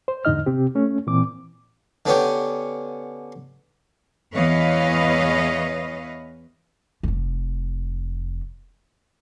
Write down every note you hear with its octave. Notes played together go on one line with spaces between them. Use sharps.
C5
E2 G#2 D3 D#4 D#5 F6
C3 C4 G4
A3 C#4
A#2 E3 C4 D6
D3 B3 C#4 G4
E2 E3 B4 C#5 D#5 F5
F1 F2